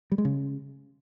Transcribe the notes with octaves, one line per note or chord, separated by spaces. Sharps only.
G3
G#3
C#3